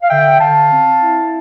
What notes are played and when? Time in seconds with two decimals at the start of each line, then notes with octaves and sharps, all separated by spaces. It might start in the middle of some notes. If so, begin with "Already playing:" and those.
0.02 F5
0.09 D3 E5 G5
0.40 D3 F5 A5
0.71 C4
1.03 E4